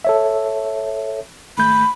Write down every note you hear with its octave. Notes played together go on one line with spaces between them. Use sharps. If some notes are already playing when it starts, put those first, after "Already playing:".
A4 C#5 E5
G#1 A3 B5 G6